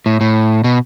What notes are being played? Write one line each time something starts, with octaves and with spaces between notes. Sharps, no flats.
A2
A2
B2